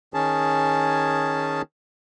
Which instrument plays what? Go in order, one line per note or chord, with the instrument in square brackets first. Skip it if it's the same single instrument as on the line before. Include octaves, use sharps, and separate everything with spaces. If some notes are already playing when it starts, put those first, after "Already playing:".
[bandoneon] D#3 C#4 G#4 A5